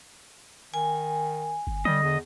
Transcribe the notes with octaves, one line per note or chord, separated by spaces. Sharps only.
D#3 G#5
G1
D3 G3 D#5
E2